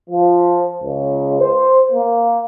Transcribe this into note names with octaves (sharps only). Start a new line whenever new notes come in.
F3
C#2
C5
A#3